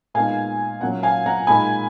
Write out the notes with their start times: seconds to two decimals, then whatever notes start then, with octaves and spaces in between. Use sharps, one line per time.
0.14 A#2 G#3 B3 D#4 F5 G#5
0.81 A#2 F#3 C#4 F#5
1.03 F5 G#5
1.26 F#5 A#5
1.47 A#2 G#3 D#4 G#5 B5